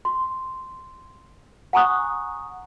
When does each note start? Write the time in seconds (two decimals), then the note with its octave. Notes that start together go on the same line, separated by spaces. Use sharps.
0.05 C6
1.73 F#5 G#5 A#5 C#6 D#6 F#6